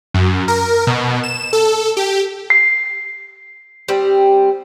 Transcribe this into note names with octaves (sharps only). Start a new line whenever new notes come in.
F#2
A#4
B2
E7
A4
G4
C7
G3 C4